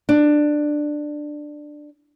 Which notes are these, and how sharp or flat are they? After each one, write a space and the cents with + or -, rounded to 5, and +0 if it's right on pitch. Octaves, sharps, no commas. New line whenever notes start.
D4 +15